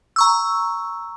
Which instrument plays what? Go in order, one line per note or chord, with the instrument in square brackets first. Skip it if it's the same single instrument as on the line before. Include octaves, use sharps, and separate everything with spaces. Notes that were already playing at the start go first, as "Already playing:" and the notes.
[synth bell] A#5 C#6 E6